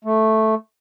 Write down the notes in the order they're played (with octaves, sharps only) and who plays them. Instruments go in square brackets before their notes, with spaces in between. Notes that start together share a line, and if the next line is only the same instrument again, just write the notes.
[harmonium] A3